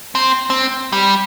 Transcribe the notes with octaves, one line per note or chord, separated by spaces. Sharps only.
C4
C4
G3